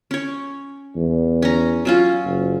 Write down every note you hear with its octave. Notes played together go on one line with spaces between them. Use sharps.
C#4 C#5
E2
C#4 A#5
F#3 C#4 F4
F#1